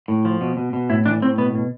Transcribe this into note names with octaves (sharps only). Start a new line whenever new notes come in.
A2
F3
B2
B2
B2
A2 E4
E3 D4
A2 C4
B2 B3
B2